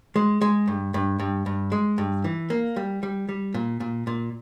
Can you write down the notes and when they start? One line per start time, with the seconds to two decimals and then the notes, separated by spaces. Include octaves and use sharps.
0.16 G#3
0.41 G#3
0.68 G2
0.94 G2
1.19 G2
1.46 G2
1.72 G#3
1.98 G2
2.24 E3
2.50 A#3
2.76 G3
3.03 G3
3.29 G3
3.54 A#2
3.80 A#2
4.07 A#2